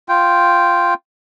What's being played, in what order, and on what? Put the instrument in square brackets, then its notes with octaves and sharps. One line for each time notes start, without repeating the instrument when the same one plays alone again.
[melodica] F4 G5